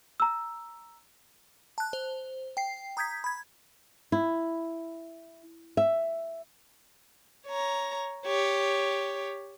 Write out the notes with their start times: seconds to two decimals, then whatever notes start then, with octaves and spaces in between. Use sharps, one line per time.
0.20 A#5 E6
1.78 A5 F#6
1.93 C5
2.57 G5 C7
2.97 A#5 D#6 G6 G#6 B6
3.24 B5 G#6
4.12 E4
5.77 E5
7.46 C#5 A#5
8.26 G4 C#5